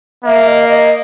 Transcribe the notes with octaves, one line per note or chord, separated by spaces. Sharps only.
A#3 E5
D#5
D#5